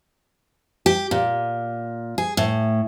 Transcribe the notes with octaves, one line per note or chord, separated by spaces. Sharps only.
G4
A#2
G#4
A2